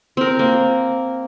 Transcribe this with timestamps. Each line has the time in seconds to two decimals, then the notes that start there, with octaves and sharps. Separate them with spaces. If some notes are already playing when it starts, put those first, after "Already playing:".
0.17 C4 A#4
0.39 A#3